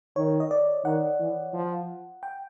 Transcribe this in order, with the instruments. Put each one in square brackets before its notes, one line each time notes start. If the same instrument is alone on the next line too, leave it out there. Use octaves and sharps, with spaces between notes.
[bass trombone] D#3 [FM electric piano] C#5
[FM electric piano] D#5
D5
[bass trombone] D#3 [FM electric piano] F#5
[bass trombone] E3
F3
[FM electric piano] G5